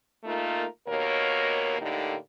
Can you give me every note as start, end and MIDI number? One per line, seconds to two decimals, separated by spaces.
0.24 0.64 57
0.24 0.64 58
0.24 0.64 63
0.24 0.64 65
0.24 0.64 70
0.87 1.76 39
0.87 1.76 47
0.87 1.76 58
0.87 1.76 70
0.87 1.76 73
1.79 2.15 45
1.79 2.15 50
1.79 2.15 58
1.79 2.15 63
1.79 2.15 67